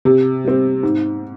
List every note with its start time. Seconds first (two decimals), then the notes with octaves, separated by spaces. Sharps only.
0.05 C3
0.44 G3 C4
0.83 G#2